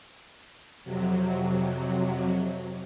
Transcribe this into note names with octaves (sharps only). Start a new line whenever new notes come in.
F2 C3 F#3